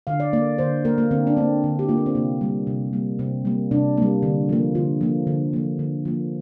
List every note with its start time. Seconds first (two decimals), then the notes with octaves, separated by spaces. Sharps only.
0.07 D3 F5
0.20 D5
0.33 A#3 D5
0.58 D3 C5
0.85 A#3 A#4
0.98 A#3
1.11 D3 C4
1.27 D4
1.37 A#3 C4
1.64 D3
1.79 G4
1.88 A#3 F4
1.97 D4
2.06 C4
2.15 C3 A#3
2.41 G3 A#3
2.67 C3
2.93 G3 A#3
3.19 C3 C4
3.45 G3 A#3
3.71 C3 D4
3.97 G3 A#3
4.23 D3
4.49 F3 A#3
4.75 D3 F4
5.01 F3 A#3
5.27 D3
5.53 F3 A#3
5.79 D3
6.05 F3 A#3